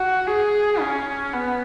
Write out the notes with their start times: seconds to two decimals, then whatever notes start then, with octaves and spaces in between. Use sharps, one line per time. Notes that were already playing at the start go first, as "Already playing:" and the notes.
Already playing: F#4
0.27 G#4
0.80 C#4
1.33 B3